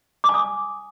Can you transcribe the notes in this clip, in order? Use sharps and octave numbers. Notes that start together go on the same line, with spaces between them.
D6
G#5
D#6